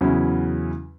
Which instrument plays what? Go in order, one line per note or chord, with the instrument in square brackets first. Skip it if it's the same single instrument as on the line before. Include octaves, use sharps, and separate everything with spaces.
[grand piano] E2 C#3 F#3 C#4 E4